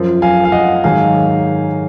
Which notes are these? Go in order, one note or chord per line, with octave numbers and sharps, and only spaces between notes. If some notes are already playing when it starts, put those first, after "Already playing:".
Already playing: F#2 F3
F5 G#5
F5
D#5 F#5
G#2 D#3 F#3 F5 G#5